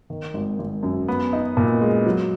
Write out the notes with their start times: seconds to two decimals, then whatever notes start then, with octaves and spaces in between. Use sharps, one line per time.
0.10 D#3
0.34 G#1
0.59 G#1
0.83 F#2
1.08 B3
1.33 D#4
1.57 A#2
1.81 G#3
2.06 F#3